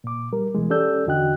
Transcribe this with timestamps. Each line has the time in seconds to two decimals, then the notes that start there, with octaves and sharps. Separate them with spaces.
0.04 A#2 D6
0.32 G3 A#4
0.55 B2 E3 G#3
0.70 C#4 G4 A4 D5 E6 G6
1.07 E2 D3 F#4 D#5 G5 F#6